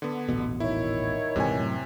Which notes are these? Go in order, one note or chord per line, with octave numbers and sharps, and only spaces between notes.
D3 B3
D#1 A1 B2
D#3 E4 C#5
D#1 G#2 C3 E3 G#5
F#2 A2